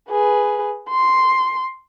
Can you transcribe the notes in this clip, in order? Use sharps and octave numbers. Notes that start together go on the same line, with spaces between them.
G#4 B4
C6